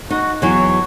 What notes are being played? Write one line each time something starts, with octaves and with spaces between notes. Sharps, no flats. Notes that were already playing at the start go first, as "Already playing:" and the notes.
D#4 F#4
E2 E3 F#3 C#5